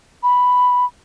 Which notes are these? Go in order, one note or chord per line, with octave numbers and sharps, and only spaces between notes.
B5